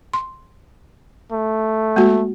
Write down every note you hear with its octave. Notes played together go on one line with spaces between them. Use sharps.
C6
A3
G#3 A#3 F#4